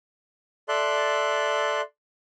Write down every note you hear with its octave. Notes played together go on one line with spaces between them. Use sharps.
A4 D5 E5 C6 F#6